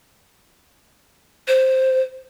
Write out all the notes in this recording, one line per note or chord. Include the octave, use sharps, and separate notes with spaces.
C5